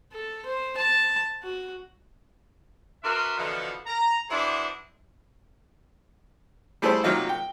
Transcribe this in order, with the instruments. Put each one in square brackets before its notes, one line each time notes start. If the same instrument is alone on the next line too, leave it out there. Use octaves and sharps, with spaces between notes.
[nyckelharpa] A4
C5
A5
F#4
[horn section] D4 F#4 A#4 B4 E5 C6
B2 D3 E3 F3
A#5
E3 D4 E4 F#4 G#4 C5
[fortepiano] G3 A3 E4 G#4 A4 C5
C3 F#3 A#3 D#4 F4
G5